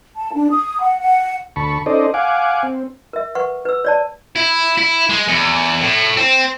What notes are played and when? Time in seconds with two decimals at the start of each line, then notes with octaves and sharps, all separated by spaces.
0.16 A5
0.34 D4
0.51 D#6
0.81 F#5
1.00 F#5
1.56 D2 A5 B5 C#6
1.86 C#4 D#4 A4 C5 D5 D#5
2.14 F5 F#5 G#5 D6
2.63 C4
3.13 A#4 E5
3.35 B4 F#5 C#6
3.65 B4 E6
3.85 C#5 D5 A5
4.36 E4
4.78 E4
5.09 G#3
5.28 E2
5.81 A2
6.17 C4